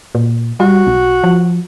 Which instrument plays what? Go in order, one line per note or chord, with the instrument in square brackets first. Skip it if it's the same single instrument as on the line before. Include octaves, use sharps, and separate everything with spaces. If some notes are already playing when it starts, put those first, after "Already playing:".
[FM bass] A#2
[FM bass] G3 [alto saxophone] F#4
[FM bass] B1
F3